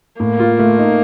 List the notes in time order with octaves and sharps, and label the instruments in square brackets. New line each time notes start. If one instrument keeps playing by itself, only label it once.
[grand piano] A2 [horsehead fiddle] A#3
[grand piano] F4
A3
D#4